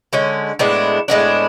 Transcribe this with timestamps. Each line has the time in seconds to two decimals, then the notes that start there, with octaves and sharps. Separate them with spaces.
0.13 D3 G#3 C#4
0.59 A2 G#3 B3 D4
1.08 A2 G#3 B3 D4